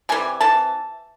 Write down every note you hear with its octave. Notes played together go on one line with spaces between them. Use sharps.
C3 E3 G3 G#5
C3 E3 A5